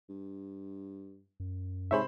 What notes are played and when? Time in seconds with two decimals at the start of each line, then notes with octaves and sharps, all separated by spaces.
0.09 G2
1.40 F#2
1.91 G#2 C3 G#4 C5 C#5 E5 B5